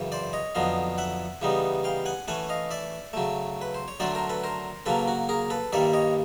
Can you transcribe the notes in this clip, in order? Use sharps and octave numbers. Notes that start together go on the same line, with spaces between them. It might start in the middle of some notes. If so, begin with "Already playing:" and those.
Already playing: F#2 C#3 E3
C5 D5
C#5 D#5
F2 D3 F#3 B3 D#5 F5
E5 F#5
C#3 E3 G3 B3 D#4
F5 G5
F#5 G#5
E3 A3 C#4 F#5 G#5
D#5 F5
D5 E5
C#3 F#3 A3
B4
C5
C#5
D3 F#3 A3 D4 C5 D5
A#4 C5
A4 B4
A#4 C5
C#3 F#3 A#3 C#4 A4 B4
F#4
G#4 A#4
A4 B4
G2 D#3 G3 A#3 D5 E5
C#5 D#5